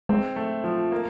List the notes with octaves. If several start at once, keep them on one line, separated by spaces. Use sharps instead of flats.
G#3 C4
A3
F3
A#3